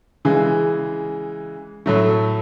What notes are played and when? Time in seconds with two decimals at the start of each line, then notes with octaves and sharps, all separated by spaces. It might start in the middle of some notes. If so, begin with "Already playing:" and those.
0.25 C#3 E3 G#3
1.86 A2 F#3 A3